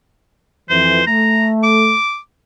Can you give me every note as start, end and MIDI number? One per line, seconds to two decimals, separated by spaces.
0.70 1.01 41
0.70 1.01 52
0.70 1.05 72
1.07 1.93 57
1.07 1.47 82
1.63 2.18 86